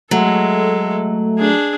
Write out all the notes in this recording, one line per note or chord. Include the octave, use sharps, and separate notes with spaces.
F#3 G#3 A3 A4
D4 G#4